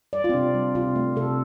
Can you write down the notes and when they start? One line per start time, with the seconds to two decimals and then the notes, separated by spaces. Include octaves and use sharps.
0.13 G3 D5
0.24 F4
0.29 C4
0.33 C3 D4
0.54 G3
0.75 C3 F4
0.96 A3
1.16 C3 A4